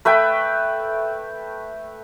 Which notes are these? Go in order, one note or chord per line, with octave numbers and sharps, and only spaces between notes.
A3 B4 E5 G5